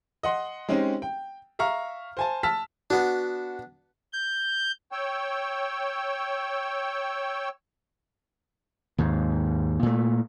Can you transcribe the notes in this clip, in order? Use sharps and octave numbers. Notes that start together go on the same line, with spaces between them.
D#5 F#5 C6
G#3 C4 C#4 D#4 G4
G5
E5 F5 A#5 C#6 F6
C5 G#5 A5
A5 E6 F6 B6
B3 D4 F#4
G6
C#5 G5 E6
D#2 G#2
A#2 A3